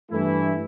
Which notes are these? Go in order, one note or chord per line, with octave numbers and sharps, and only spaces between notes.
G2 E3 A3 E4